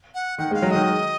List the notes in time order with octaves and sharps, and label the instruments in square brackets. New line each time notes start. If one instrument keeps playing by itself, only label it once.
[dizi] F#5
[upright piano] D#3 [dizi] F#5
[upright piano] G#3
[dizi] F5
[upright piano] F#3
[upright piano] D#3 [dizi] D#5